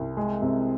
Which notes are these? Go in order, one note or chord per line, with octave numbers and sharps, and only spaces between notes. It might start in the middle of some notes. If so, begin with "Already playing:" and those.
Already playing: C2
G#3
C3